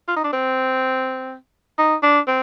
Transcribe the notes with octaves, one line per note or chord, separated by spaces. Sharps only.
F4
D#4
D4
C4
D#4
D4
C4